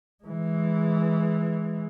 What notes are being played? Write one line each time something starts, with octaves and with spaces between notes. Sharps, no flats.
E3 G#3